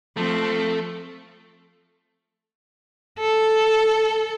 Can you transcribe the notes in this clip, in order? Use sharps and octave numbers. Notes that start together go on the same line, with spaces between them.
F3 A3 C4
A4